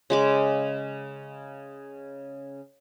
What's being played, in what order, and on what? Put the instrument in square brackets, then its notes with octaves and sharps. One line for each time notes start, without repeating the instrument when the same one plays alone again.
[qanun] C#3 G#3 D6